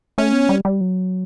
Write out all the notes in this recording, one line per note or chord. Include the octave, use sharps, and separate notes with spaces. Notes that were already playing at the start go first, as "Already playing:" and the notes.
A3 C#4
B3
G3
G3
F#3